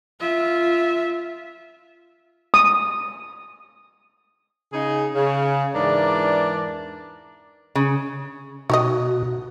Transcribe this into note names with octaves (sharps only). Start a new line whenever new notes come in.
F4 E5
D#6
C#3 D#4 G#4
C#3
E2 G#2 E3 D4 A#4 D5
C#3
B2 D#4 F#4 G4 D#5